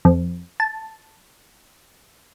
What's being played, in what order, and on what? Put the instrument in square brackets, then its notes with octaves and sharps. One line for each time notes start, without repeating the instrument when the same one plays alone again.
[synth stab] F2
A5